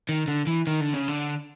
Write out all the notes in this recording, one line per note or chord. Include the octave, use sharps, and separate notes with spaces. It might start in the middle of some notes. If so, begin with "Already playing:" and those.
D#3
D3
E3
D#3
D3
C#3
D3